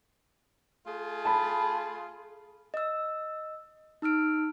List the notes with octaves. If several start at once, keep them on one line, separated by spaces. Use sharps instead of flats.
A3 F4 G#4
A5 B5
D#5 E6
D#4 E6 F6 D7